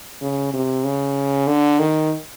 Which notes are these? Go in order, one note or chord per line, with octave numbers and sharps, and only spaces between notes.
C#3
C3
C#3
D3
D#3